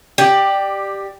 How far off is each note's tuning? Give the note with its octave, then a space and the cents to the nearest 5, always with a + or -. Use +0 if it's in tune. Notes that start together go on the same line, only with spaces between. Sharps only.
G4 +0 D5 +20